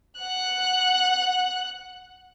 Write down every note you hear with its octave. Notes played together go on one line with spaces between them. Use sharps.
F#5 F#6